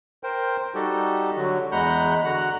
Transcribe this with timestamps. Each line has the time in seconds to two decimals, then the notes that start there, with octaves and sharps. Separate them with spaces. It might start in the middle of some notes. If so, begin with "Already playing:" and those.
0.23 A#4 C5 G5
0.75 G3 D#4 F#4 G4 A4
1.36 D3 F#3 F#4
1.72 E2 G#3 F#5 A#5 B5 G6
2.24 D3 F#4 F#5 A#5 F#6